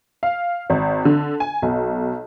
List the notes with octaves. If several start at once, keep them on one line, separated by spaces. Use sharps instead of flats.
F5
G#1
D3
G#5
B1